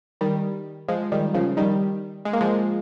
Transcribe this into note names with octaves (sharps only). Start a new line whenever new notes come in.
D#3 G3
F3 G#3
D#3 G3
C#3 F3
D#3 G3
G#3
A#3
F3 G#3